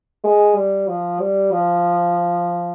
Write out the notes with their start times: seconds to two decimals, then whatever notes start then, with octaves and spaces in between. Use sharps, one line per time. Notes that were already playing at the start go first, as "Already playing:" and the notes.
0.24 G#3
0.56 G3
0.88 F3
1.20 G3
1.52 F3